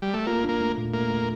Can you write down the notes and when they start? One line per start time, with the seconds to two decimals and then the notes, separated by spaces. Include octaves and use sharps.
0.02 G3
0.14 A3
0.27 A#3 F4
0.44 A#3 D4
0.61 A3
0.78 A#2
0.94 A3 A#3
1.10 A3